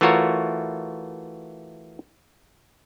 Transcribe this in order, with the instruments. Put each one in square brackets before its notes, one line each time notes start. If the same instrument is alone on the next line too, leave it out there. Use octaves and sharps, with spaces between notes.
[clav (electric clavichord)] E3 A3 F4 F#4 A#4 C#5